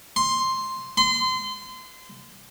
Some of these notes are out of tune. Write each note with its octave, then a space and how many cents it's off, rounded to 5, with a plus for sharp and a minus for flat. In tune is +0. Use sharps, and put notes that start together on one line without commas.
C6 +5
C6 -30